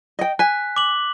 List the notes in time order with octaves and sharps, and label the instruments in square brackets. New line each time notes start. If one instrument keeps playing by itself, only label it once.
[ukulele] D#5 G5
[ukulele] G#5 [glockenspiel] F#6 B6
[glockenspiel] D6 F#7